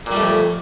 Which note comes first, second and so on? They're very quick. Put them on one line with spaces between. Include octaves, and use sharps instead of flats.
A#2 G3 A3 F2